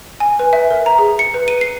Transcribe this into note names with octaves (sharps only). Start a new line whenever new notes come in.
G#5
B4
E5
A#4
A#5
G#4
C#7
B4
D#7
C7